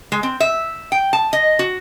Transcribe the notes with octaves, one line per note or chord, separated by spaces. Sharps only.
G#3
C4
E5
G5
A5
D#5
F#4